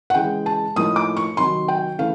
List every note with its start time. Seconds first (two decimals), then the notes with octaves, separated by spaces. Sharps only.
0.10 F#5
0.14 C#3 E3 G#3 G5
0.46 A5
0.76 A2 F3 A#3 D#4 D#6
0.96 D6
1.17 C#6
1.37 C3 D#3 F#3 C6
1.68 G5
1.98 C#3 E3 A3 F5